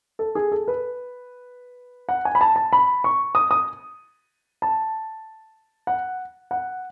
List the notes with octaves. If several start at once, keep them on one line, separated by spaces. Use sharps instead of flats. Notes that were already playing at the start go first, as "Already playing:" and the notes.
A4
G#4
A4
B4
F#5
G#5
B5
A5
A5
B5
C#6
D#6
D#6
A5
F#5
F#5